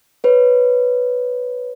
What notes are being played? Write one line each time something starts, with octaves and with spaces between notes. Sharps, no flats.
B4 C#5